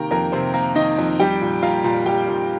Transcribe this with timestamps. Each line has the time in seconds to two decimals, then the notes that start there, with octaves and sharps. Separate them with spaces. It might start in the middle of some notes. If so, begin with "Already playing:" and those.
Already playing: C3 D#3 A#3 G4 A#4 G5 A#5
0.11 F2 A#3 A#4
0.32 C3 C4 C5
0.54 A#3
0.75 D#3 D#4 D#5
0.98 F2
1.19 G3 G4 G5
1.41 A#2
1.62 A#3 F4 F5
1.84 A#2
2.06 G3 G4 G5
2.28 A#2